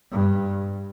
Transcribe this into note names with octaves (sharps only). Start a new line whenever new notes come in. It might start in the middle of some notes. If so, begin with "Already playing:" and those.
G2